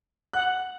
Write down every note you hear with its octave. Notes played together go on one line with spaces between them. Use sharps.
F#5 F#6